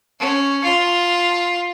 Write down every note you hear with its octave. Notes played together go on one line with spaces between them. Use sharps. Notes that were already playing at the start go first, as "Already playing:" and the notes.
C#4
F4